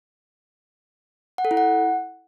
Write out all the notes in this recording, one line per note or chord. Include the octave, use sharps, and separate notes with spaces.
F#5
A4
E4
F#5